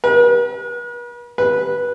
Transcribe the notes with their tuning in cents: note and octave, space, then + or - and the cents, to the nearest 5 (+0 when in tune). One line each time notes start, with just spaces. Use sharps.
B4 -45
B4 -15